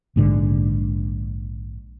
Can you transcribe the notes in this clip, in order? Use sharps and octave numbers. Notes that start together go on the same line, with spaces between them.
A#1 G#2 D3